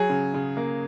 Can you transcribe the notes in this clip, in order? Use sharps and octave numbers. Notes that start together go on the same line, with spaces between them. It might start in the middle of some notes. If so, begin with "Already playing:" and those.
Already playing: F#3 G#4
C#3
C#3
A#3